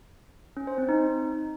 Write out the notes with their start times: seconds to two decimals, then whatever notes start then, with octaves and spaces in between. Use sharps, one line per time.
0.57 C#4
0.67 C5
0.78 C4
0.89 D#4